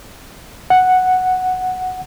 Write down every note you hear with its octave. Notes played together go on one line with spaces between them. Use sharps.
F#5